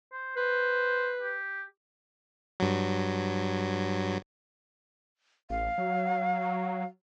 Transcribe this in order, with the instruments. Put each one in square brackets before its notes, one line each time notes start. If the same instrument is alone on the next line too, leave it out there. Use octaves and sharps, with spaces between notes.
[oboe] C5
[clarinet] B4 [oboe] C5
[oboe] G4
[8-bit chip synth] G2 F#3
[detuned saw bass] A1 [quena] F5
[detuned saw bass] F#3